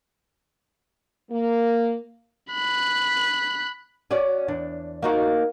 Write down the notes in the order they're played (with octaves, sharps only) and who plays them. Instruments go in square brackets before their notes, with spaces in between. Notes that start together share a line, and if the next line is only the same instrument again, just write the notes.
[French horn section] A#3
[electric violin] B5 F#6
[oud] C#4 F#4 D5
E2 D4
A#3 D#4 F#4